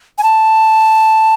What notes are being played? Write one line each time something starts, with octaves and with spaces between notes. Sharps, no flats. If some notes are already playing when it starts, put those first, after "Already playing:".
G#5
A5